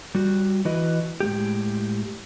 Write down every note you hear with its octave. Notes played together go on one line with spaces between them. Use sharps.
G3 F#4
E3 E4 F#4 B4 D#5
A2 G#3 G4